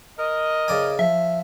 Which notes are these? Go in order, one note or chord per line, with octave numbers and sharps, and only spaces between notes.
A#4 D#5
C#3 D5 G#5
F3 E5